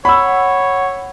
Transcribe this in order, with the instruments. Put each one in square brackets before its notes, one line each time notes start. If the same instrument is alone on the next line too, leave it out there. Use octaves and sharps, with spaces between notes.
[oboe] C#5 [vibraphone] F#5 [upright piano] B5 E6